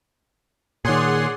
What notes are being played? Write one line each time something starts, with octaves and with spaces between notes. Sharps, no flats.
A#2 D#3 G#4 C#5 D5 F#5 C6